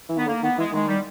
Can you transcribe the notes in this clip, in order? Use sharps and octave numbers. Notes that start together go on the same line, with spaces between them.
E3
D#3 B3
D3 A#3
D#3 B3
E3 G#3
D#3 G#3
G3